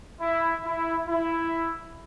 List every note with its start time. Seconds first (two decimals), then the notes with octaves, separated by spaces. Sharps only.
0.20 E4
0.64 E4
1.08 E4